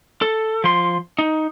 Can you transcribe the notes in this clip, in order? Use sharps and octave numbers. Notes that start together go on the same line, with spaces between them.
A4
F3 C6
D#4